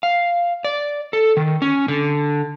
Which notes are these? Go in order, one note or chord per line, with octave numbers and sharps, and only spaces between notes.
F5
D5
A4
D#3
C#4
D3